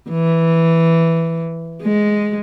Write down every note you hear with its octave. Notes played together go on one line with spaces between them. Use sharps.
E3
G#3